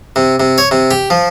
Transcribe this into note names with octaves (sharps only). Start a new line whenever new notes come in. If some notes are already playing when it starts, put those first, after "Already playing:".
C3
C3
C#5
C3
G4
F3